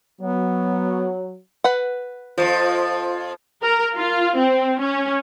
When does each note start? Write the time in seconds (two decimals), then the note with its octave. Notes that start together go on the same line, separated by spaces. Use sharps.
0.21 F#3 B3
1.64 B4 F#5
2.38 F2 A#2 F3 F4 C5
3.62 A#4
3.95 F4
4.36 C4
4.80 C#4